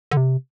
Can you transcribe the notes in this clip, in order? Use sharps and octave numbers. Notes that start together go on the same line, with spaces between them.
D3
C3